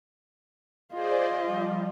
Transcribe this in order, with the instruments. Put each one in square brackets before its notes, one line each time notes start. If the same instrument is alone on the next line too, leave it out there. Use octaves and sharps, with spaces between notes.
[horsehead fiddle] F4 D#5 [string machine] G#4 C5 D5
[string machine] F3 G3